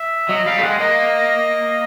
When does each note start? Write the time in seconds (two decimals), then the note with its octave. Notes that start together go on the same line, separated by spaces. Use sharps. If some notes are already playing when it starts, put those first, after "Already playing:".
Already playing: E5
0.29 F#3 D#5
0.46 G3 F5
0.59 A3
0.63 G#3 F#5
0.80 A#3 D#5